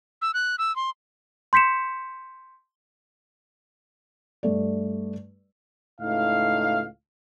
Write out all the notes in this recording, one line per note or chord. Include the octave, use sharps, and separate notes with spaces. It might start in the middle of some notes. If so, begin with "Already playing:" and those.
E6
F#6
E6
C6
C6 G6 B6 C#7 E7
G2 A3 D5
C#2 A2 D#4 F5